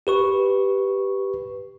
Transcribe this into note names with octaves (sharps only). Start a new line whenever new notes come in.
G4 B4 C#6